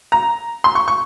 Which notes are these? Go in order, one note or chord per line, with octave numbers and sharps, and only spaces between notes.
A#5
C6
C#6
C#6